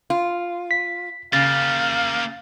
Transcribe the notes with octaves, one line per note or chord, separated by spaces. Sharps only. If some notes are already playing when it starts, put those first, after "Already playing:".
F4
B6
C#3 A#3 G4 F5 A6